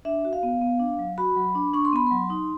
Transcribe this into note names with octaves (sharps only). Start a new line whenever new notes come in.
D4 E5
F#4
F5
B3
B3
D4
F#3
F#4 B5
F#3
D4
D4 C#6
C6
B3 B5
F#3 C6
D#4